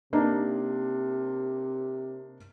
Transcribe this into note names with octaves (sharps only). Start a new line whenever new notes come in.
C3 A#3 D4 D#4